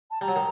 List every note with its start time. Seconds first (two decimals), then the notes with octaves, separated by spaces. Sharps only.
0.10 A5
0.21 G3 A#5
0.28 F#3
0.36 D#3